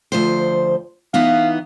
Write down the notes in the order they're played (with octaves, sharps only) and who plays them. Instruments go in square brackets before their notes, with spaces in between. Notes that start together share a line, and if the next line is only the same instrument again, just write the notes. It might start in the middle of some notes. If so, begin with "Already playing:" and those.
[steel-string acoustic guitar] D2 F3 C5
[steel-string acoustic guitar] E3 B3 D#4 [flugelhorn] F5